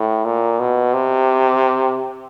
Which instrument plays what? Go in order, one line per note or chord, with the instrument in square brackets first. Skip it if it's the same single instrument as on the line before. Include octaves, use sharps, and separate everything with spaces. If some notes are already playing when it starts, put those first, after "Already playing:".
Already playing: [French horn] A2
A#2
B2
C3